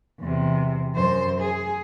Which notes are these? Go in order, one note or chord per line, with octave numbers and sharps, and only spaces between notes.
E2 C3
F#2 C5
G#4